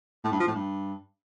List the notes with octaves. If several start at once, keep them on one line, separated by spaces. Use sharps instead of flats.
A2
G2
F3
A2
G2